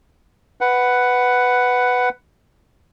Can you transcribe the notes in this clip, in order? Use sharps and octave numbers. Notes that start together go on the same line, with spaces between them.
B4 F#5